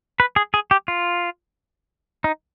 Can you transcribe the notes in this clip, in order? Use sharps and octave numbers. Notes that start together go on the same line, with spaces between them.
B4
G#4
G#4
G4
F4
D#4